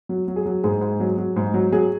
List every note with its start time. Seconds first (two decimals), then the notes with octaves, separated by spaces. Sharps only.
0.09 F#3
0.28 F#3
0.36 G#4
0.46 F#3
0.64 G#2 G#4
0.81 G#2
1.00 F#3
1.18 F#3
1.36 G#2
1.54 F#3
1.72 F#3 G#4